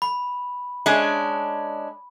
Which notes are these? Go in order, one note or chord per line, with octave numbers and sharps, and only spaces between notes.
B5
G#3 C#4 D4